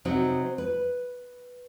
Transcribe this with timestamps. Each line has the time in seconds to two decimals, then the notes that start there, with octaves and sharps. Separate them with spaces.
0.05 C3 F#3 C4 D#4 D#5
0.58 B4